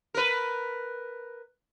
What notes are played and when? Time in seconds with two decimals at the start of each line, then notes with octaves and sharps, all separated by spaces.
0.14 A#4 B4